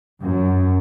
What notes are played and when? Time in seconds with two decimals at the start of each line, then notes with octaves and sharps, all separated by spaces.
0.21 F#2